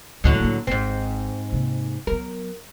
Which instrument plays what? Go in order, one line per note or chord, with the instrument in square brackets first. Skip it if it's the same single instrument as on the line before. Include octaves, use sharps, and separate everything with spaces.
[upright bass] D2 E3 [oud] A2 D3 F#3
[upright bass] A#3 D4
[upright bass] G#1 [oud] G#2 C4
[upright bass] C3 A#3
[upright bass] F#3 B3 [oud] A#4